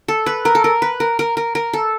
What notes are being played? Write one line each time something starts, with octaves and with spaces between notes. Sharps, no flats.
A4
B4
A#4
A4
A#4
B4
A#4
A#4
A#4
A#4
A4